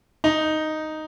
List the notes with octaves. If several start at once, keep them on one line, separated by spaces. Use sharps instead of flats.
D#4